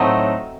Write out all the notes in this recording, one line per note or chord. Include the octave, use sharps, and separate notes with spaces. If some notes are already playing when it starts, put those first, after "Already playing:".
Already playing: A2 F#3 A3 C4 D#4